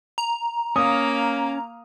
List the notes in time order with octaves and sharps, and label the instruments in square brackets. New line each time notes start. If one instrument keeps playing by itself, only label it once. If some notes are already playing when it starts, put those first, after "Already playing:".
[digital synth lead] A#5
[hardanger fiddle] A#3 F5 [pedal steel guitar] C#4 [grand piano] D#6